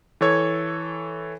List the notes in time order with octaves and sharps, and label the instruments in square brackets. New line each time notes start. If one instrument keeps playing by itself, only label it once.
[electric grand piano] E3 A4 C#5 G#6